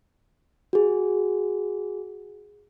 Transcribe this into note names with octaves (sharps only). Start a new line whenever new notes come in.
F#4 G#4